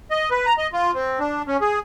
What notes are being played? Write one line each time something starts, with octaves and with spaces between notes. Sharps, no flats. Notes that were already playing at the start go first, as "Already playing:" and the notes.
D#5
B4
A#5
D#5
F4
C4
D4
C#4
G#4